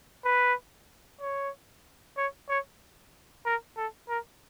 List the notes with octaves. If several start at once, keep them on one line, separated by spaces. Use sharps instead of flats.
B4
C#5
C#5
C#5
A#4
A4
A#4